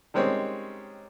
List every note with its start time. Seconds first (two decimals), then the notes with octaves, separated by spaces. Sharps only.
0.14 D#3 G3 G#3 C4 C#4 C#5